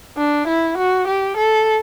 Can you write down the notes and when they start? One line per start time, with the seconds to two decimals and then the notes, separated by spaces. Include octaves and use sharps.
0.18 D4
0.48 E4
0.78 F#4
1.08 G4
1.37 A4